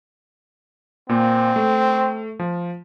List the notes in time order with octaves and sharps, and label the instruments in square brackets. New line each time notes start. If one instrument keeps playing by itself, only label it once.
[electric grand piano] A#2 A#3 [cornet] C4
[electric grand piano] A3
F3